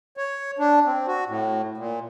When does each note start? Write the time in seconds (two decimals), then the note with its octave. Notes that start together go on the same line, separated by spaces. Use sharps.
0.17 C#5
0.59 D4
0.86 C4
1.08 F#4
1.28 A2
1.77 A#2